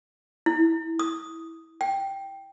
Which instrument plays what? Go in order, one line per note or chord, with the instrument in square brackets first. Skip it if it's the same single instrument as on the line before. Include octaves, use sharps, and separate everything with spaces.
[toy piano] E4
D#6
G5